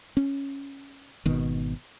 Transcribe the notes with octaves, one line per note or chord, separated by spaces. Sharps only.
C#4
G#1 B2 D#3